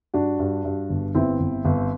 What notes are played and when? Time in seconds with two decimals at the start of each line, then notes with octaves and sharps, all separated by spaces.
0.14 G2 D4 F#4
0.39 G2
0.64 G2
0.90 G1
1.15 G1 C4 E4
1.40 G1
1.65 G1